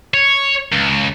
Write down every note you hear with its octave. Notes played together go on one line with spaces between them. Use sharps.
C#5
C#2